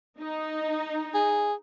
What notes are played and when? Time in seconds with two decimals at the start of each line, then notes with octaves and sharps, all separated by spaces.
0.19 D#4
1.14 G#4